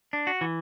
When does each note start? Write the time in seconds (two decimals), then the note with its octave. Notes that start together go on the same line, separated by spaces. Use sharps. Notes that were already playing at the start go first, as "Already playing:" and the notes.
0.13 D4
0.27 F#4
0.41 E3